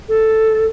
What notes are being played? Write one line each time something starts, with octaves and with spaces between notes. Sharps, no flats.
A4